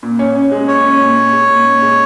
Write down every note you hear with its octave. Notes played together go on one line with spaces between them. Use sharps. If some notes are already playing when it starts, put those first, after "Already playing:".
A#2
C#4
C#4
G#3
C#4 C#5
C#4
A#2
A#2
G#3
A#2
A#2
G#3